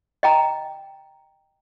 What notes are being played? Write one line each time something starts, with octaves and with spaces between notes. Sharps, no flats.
D#5 G5 A#5